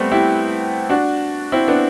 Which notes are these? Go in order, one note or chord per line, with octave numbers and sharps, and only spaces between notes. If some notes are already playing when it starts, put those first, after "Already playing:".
Already playing: G3 A3 B3 C4
E4 G4
D4 F#4
C4 E4
B3 D4